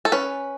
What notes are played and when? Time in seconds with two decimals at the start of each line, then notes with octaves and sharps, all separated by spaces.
0.05 A4
0.12 C#4 B4